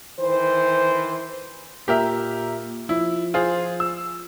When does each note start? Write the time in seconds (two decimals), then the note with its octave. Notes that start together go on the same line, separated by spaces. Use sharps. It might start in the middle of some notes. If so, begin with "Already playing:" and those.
0.19 D#3 E3 C5
1.88 A#2 G4 A#4 E5
2.89 F3 E4
3.34 F4 G#4 C5
3.80 E6